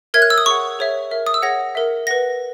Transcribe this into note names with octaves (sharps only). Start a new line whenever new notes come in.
A#4 C#5 E5 G#6
F#6
E6
D#6
G#4 C#5 F#5 C#6
G#4 C#5 E5
A#4 E5
D#6
E6
G#4 C#5 F#5 A#6
A#4 E5
B4 F#5 A#6